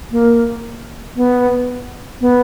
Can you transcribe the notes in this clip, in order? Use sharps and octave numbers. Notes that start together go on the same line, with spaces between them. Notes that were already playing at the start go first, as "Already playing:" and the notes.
A#3
B3
B3